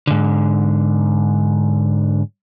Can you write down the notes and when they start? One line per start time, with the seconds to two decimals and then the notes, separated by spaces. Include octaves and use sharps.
0.07 G#2 D3